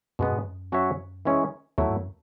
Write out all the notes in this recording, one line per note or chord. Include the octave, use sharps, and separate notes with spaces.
F#2 B2 G#3 B3
G#2
F#2
F#3 C#4 F#4 C#5 E5
E3 G#3 C#4 E4
E2 F#3 A3 E4
G#2
F#2